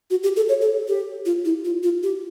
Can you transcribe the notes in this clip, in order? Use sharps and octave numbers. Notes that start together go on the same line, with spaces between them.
F#4
G4
A4
C#5
A4
G4
F4
E4
F4
F4
G4